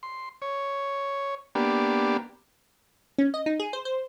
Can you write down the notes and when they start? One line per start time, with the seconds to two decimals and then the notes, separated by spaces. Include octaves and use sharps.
0.03 C6
0.42 C#5
1.55 A#3 B3 D4 G4
3.18 C#4
3.34 D#5
3.46 D#4
3.60 G#4
3.73 C5
3.85 C5